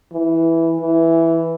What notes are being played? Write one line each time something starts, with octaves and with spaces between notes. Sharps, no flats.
E3
E3